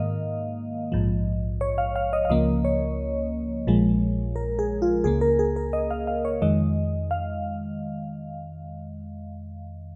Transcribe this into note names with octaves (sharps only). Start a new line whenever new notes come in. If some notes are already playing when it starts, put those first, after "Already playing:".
Already playing: G#2 D#3 A#3 D#5 F5
A#1 G#2 F3
C#5
F5
F5
D#5
F5
C#2 C#3 F3 A#3 D#5
C#5
A#1 A#2 F3 G#3
A#4
G#4
F4
C#2 C#3 A#3 G#4
A#4
G#4
A#4
D#5
F5
F5
C#5
F2 D#3 G#3 D#5
F5